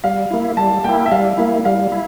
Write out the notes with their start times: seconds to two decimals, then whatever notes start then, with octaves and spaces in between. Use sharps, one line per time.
0.04 G3 F5
0.31 A#3 E4
0.57 G3 A5
0.84 A#3 E4 G5
1.06 E5
1.11 G3 F5
1.38 A#3 E4
1.65 G3 F5
1.92 E4